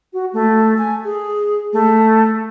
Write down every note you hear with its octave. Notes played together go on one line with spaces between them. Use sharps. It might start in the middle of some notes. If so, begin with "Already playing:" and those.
F#4
A3
G#5
G#4
A3